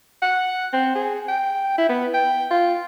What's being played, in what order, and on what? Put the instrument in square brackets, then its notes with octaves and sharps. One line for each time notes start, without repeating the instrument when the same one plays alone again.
[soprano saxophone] F#5
C4
G#4
G5
E4
B3
G5
F4